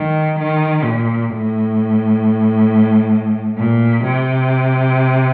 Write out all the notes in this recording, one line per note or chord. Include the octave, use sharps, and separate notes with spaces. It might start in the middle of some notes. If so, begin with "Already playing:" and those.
Already playing: D#3
D#3
A#2
A2
A#2
C3